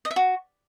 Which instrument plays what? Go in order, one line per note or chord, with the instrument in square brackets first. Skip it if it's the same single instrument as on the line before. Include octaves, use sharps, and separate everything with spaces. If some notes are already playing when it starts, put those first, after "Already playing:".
[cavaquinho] D#5
E5
F#4